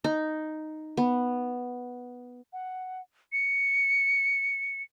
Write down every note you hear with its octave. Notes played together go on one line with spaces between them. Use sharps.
D#4
B3
F#5
C#7